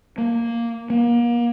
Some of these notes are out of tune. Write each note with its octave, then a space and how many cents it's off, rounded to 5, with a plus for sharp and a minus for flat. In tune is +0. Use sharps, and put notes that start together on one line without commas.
A#3 +0
A#3 +35